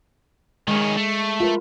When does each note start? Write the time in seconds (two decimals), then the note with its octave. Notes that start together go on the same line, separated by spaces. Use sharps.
0.68 D#3 G#3 C#4
0.97 A3
1.40 F4 A#4 B4